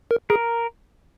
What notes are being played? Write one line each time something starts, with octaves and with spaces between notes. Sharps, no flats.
A#4
G#4 A#4